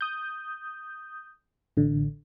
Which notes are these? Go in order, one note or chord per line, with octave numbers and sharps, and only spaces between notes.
D#6 G6
A1 D3